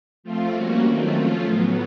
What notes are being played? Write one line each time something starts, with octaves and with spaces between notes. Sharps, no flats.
F3 A3 C4 F4
G3 A#3 C#4 F#4
D#3 F#3 A3 C4 F4
F3 A3 C#4 F4
A2 F#3 B3